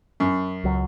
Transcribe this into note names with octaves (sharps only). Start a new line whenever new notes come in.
F#2
C#2 F#3